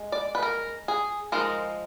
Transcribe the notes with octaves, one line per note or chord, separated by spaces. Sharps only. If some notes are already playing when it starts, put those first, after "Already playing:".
Already playing: G#3
D5
B4
A#4
G#4
F3 G#3 D#4 A#4